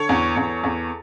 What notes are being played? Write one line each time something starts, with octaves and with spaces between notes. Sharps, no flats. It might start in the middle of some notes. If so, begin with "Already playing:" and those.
Already playing: D3 A4 C#5
E2
E2
E2